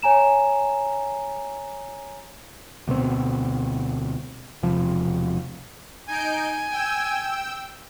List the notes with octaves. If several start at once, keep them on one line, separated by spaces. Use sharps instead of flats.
C#5 G#5 A#5 E7
D2 B2 G#3 C4
E1 C3 F3
D#4 G#5 G6 D7
G5 E6